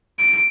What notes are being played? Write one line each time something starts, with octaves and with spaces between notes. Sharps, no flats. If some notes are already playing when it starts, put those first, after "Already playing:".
D7